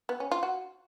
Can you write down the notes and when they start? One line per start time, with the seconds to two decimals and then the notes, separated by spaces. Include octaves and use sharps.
0.09 B3
0.20 C#4
0.31 F4
0.43 F#4